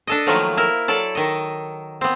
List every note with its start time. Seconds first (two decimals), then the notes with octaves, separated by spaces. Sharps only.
0.07 D4 A4 D#5
0.27 D#3 F3 F#3 A3 A#3
0.57 E4 A#4
0.88 F#3 A4 D5
1.15 D#3 D#5
2.01 B3 C4